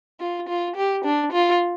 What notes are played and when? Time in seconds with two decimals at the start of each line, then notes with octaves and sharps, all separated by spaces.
0.20 F4
0.48 F4
0.76 G4
1.05 D4
1.33 F4